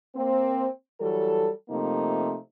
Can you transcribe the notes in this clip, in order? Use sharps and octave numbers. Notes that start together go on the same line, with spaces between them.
A#3 C4
E3 F#3 G3 A4
C3 F3 A3 A#3 D#4